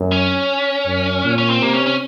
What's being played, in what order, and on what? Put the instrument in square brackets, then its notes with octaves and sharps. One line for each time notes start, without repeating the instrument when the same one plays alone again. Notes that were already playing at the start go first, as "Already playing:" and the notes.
Already playing: [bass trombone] F#2
[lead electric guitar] C#4
[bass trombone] F#2
A#2
[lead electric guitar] C#4
C4
[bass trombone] C3 [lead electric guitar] A#3
[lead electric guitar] C#4
C#4